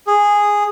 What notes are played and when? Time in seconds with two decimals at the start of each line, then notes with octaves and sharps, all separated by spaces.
0.07 G#4